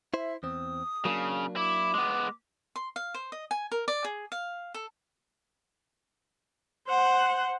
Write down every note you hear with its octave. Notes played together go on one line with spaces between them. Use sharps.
E4 C5 E5
E2 C4 D#6
C#3 F#3 A#3 D4
E4 D6
G#3 B3
C6
F5
C5
D#5
G#5
A#4
D5
G#4
F5
A4
C5 F#5